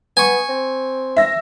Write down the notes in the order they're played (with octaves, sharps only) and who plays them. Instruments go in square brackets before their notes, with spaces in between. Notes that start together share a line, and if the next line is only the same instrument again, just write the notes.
[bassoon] B3 [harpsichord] G#5 C#6
[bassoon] C4
[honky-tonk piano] E5 A#6